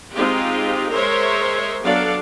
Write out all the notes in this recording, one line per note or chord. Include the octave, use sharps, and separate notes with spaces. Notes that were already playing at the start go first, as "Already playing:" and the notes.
G#3 C4 D#4 F4 G4
G#3 A#4 C5 C#5 E5
F#3 B3 D4 A4 D5 F5